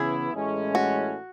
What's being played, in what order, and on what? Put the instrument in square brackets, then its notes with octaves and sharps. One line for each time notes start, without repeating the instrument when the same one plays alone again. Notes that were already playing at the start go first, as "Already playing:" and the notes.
Already playing: [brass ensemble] C#3 E3 B3 E4 [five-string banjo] G#4
[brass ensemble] A1 A2 G#3 C#4
[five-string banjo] F#4